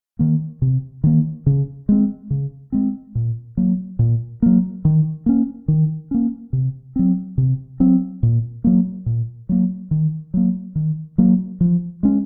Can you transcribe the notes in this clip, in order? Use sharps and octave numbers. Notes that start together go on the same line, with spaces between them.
D#3 A#3
C3
D#3 A#3
C#3
G#3 C4
C#3
G#3 C4
A#2
F#3 A#3
A#2
F#3 A#3
D#3
A#3 C#4
D#3
A#3 C#4
C3
F#3 C4
C3
F#3 C4
A#2
F#3 A#3
A#2
F#3 A#3
D#3
F#3 A#3
D#3
F#3 A#3
F3
G#3 C#4